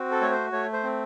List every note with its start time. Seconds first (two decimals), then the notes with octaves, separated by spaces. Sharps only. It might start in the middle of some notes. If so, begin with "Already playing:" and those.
Already playing: C4 F#4
0.11 A4
0.21 A3 C#5
0.31 C5
0.52 A3 C#5
0.73 C5
0.83 C4